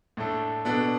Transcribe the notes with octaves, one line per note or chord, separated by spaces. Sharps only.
A2 A3 D4 A4
B2 B3 D4 A4